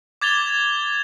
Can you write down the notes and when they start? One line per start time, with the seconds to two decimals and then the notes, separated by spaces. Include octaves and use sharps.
0.22 D6 G#6 A6 F7 G7